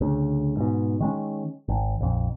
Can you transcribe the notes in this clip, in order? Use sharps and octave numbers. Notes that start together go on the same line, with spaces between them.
D2 C#3
G#2 B2
D#3 G#3 C#4
G#1
A#1 F2